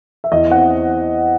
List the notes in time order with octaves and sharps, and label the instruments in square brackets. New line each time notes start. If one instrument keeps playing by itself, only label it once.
[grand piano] E5
E2 D#5
C4 F#5